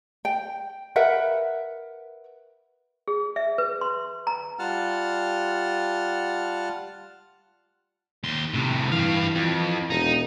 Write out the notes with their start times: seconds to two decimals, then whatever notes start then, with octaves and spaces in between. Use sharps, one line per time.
0.25 G5
0.96 A#4 B4 E5 F#5
3.08 G#4
3.36 E5
3.58 B4
3.81 C6
4.27 A#5
4.59 G3 F4 F#5 A5 F6
8.24 D#2 C6
8.54 A2 C3
8.92 G2 E3 F5
9.35 F2
9.90 E1 D#4